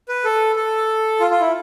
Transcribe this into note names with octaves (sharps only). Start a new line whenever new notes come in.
B4
A4
A4
F4
F4
E4